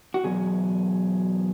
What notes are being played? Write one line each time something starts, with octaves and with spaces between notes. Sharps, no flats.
F#4
E2 B2 F#3 G#4